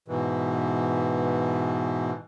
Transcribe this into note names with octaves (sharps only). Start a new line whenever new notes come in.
G#2 B2 E3